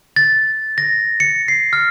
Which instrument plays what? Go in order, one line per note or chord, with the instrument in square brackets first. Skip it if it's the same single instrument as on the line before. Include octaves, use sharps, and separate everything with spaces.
[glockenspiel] A6
A#6
C#7
C7
F6